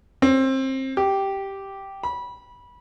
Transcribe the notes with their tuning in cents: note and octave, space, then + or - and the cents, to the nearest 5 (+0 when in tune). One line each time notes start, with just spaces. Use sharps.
C4 +25
G4 -5
B5 -20